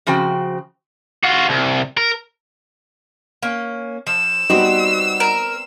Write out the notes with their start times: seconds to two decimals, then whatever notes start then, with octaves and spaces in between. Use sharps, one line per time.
0.07 C#3 F3 C4 F#4 C5 G5
1.23 F4 F#4
1.49 C2
1.97 A#4
3.42 A#3 C#4
4.07 F3 E6
4.50 G3 B3 C4 D#4 F#4 D5
5.20 A#4